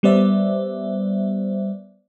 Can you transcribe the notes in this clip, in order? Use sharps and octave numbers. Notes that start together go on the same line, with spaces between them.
G3 B3 C5 D5 E5